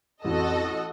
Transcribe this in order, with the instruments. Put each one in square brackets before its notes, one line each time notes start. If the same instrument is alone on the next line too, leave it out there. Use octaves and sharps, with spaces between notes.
[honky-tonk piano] A1 [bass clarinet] F2 [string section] F#4 A4 D#5